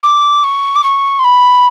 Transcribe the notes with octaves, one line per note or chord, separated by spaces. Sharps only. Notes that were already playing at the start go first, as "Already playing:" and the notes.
D6
C#6
D6
C#6
C6
B5